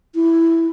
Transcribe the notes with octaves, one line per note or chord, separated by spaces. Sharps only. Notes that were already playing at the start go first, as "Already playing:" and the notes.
E4